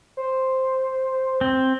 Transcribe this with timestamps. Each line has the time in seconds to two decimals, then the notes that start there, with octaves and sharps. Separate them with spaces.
0.17 C5
1.41 C4